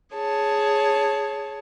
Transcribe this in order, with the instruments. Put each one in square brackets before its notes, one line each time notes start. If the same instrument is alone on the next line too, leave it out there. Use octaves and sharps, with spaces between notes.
[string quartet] G#4 C#5 A5